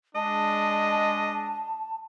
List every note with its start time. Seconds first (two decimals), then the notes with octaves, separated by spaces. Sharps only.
0.16 G#3 D4 D#5 A5